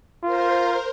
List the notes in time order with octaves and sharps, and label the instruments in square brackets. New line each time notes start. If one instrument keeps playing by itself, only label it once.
[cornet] F4 [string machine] A#4 C5